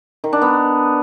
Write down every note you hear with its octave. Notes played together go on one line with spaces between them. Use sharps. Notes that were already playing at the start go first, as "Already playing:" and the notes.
D#3
D4
B3